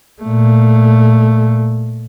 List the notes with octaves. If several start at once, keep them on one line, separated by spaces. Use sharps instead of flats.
A#2 A3